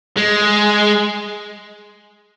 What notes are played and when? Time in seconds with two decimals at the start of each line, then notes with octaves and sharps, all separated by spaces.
0.17 G#3